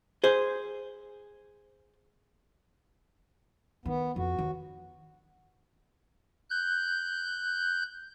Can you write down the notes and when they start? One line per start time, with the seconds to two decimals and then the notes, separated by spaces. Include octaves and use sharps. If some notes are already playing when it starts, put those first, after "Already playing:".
0.24 G#4 C5
3.86 D#3 B3
4.16 F2 F#4
4.39 D#2
6.50 F#6 G6